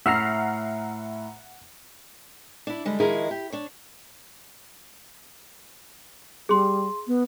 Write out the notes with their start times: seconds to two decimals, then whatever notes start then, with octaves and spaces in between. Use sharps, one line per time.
0.06 A2 E5 F#5 A#5 F6 C7
2.67 D4 E4
2.85 D3 G3 G#3
3.00 D#3 F3 G#3 E4 G#4 A#4
3.31 G4
3.52 D4 C#5
6.49 G3 G#4 C6
7.07 B3